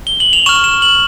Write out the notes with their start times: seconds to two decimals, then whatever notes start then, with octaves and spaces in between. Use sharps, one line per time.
0.07 G7
0.20 F#7
0.33 F7
0.46 C#6 F6 E7
0.64 E7
0.82 F#7